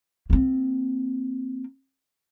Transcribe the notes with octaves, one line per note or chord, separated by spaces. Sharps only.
A#3 C4